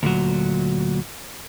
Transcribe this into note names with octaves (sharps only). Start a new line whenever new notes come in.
D2 A#2 F#3